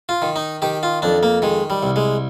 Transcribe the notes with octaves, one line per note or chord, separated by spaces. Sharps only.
F4
D#3
D#4
D#3 G4
F4
F2 D4
A#3
D#3 G#3
G3
C2
G#3